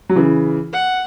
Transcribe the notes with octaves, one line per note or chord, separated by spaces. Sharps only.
F#3
C#3 E3
F#5